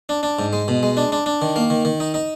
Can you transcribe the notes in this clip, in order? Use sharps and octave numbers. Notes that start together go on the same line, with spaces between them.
D4
D4
G#2
G#3
B2
G#3
D4
D4
D4
D#3
A#3
D#3
D#3
D#4
D#4